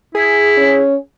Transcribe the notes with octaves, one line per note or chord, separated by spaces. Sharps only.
E4 G#4
C#4